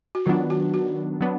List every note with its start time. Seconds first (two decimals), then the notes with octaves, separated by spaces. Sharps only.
0.15 F#4
0.26 D#3 F#3 B3 D4 F4
0.50 F#4
0.74 F#4
1.21 F#3 B3 D4